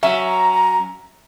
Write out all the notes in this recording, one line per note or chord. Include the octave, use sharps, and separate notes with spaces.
F#3 C#4 E5 A#5